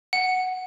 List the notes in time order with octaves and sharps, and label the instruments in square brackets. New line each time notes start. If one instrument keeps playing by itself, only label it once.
[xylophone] F#5